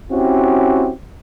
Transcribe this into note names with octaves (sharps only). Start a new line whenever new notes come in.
C4 C#4 E4 F#4 G4